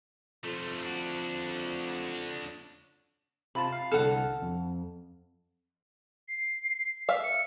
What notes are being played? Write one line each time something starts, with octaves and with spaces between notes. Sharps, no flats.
F2 A3 F4
D4 F#4
C3 F4 A5 B5
F5
C2 D3 A4 F#5 F6
F2
C7
E5 F5
C#7